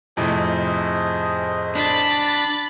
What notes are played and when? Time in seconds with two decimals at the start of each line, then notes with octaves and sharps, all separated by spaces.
0.17 F2 A2 C3 G#4 C5 D#5
1.75 D4 B5 A6